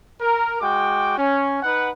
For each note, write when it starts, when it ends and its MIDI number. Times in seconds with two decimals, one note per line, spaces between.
0.21 0.57 70
0.61 1.16 56
0.61 1.16 66
0.61 1.16 79
0.61 1.16 86
1.17 1.58 61
1.63 1.89 63
1.63 1.89 71
1.63 1.89 78